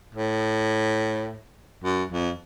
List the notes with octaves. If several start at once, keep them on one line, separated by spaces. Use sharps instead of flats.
A2
F#2
F2